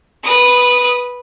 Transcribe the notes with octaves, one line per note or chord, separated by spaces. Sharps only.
B4 D#6